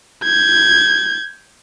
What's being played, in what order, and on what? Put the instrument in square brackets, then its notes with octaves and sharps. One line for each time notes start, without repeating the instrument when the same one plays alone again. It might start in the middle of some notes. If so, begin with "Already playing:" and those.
[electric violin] G6 G#6